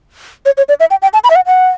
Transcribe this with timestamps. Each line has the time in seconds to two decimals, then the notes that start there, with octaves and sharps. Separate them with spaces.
0.46 C#5
0.57 C#5
0.69 D5
0.80 E5
0.91 G5
1.02 G5
1.13 A5
1.24 B5
1.30 E5
1.36 F#5
1.47 F#5